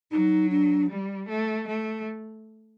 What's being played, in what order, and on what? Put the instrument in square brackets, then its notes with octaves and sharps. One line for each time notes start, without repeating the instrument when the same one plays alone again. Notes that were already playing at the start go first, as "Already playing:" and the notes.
[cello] F#3 [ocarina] D#4
[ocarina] D4
[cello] G3
A3
A3